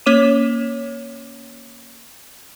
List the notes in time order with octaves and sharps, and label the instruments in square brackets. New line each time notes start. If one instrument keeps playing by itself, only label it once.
[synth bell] A#3 C#4 C#5 D6 D#7 E7